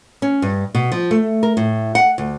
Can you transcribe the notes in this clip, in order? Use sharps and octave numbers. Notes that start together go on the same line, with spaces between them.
C#4
G2
B2
F3
A3
A#4
A2
F#5
D2